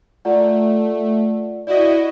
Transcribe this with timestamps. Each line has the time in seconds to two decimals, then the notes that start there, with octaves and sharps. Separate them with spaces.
0.25 A3 F4 D5 F#5
1.67 E4 F#4 D5 D#5